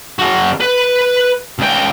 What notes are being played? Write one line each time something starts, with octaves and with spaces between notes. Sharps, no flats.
C#3 F#4
B4
C#2 G5